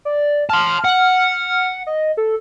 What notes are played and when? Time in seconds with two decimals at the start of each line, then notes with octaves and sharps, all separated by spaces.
0.05 D5
0.50 A5 C6 F6
0.84 F#5
1.87 D#5
2.17 A4